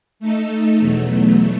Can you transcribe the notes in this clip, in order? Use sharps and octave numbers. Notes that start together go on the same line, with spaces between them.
A3 D#4 A4
E2 B2 F#3 A3